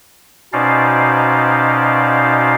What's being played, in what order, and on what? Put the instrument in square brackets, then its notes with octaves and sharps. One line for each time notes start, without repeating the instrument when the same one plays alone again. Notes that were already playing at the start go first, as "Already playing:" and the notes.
[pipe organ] B2 C#4 D#4 C5 D5 F5